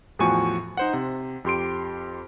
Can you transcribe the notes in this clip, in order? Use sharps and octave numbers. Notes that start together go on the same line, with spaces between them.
E2 A2 F3 F#4 G#5 C#6
D#4 C5 F#5
C3
F2 G4 C6 D7